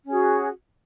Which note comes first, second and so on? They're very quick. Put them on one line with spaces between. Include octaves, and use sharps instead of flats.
C#4 G#4 F#4